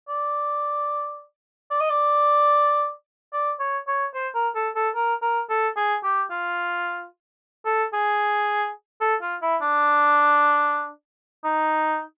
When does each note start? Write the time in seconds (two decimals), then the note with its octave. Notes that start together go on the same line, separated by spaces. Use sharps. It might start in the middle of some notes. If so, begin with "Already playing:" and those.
0.08 D5
1.70 D5
1.81 D#5
1.90 D5
3.33 D5
3.59 C#5
3.87 C#5
4.14 C5
4.35 A#4
4.55 A4
4.75 A4
4.95 A#4
5.22 A#4
5.49 A4
5.77 G#4
6.03 G4
6.30 F4
7.65 A4
7.93 G#4
9.01 A4
9.22 F4
9.42 E4
9.61 D4
11.44 D#4